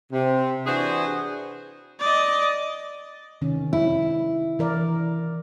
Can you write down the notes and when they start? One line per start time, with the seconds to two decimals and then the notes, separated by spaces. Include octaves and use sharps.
0.12 C3
0.66 E3 D4 F#4 G#4 B4 C5
2.00 D5 D#5
3.41 C3 D#3 C#4
3.73 E4
4.59 E3 A#4 D5